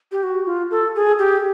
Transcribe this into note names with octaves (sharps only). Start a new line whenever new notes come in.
G4
F#4
F4
A4
G#4
G4